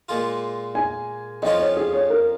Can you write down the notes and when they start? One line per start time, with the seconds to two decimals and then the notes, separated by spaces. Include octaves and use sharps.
0.09 A#2 G#3 F4
0.75 G#5
1.42 F2 F3 C#4 F4 D#5
1.60 C#5
1.77 G#4
1.93 C#5
2.10 A#4